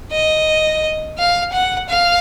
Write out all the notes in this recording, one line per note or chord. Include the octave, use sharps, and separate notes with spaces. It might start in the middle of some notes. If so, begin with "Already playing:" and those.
D#5
F5
F#5
F5